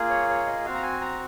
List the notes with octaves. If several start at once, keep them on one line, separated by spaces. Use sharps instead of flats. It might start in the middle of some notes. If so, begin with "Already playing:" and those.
Already playing: A#3 F4 G#4
C#5
C#5
D#5
C4 F#4 F5
A#5
G#5
A#5